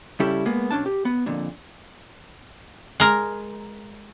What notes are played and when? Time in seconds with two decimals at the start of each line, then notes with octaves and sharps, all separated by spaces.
0.20 C#3 G3 C#4 E4 G4 A4
0.46 G#3 A#3 B3
0.71 B1 C#4 D4 A5
0.86 G4
1.05 B3
1.26 F2 A#2 D3
3.00 G#3 A#4